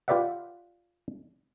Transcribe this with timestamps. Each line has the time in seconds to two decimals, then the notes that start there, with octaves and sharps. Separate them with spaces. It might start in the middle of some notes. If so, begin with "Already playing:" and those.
0.08 F4 G4 B4 D5 E5 F#5